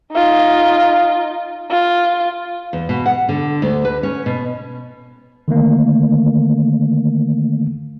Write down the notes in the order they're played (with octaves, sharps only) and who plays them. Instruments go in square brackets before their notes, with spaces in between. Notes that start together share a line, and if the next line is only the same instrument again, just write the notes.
[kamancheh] D#4 F4
F4
[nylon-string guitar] E2
B2
F#5
D3
D2
B4
C#4
B2
[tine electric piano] D3 D#3 A3 A#3